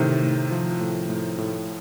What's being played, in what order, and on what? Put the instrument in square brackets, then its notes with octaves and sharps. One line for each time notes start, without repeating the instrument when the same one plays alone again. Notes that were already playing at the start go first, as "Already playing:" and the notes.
Already playing: [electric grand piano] A2 [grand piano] C3 D#3
[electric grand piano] A2
F3
A2
A2
A2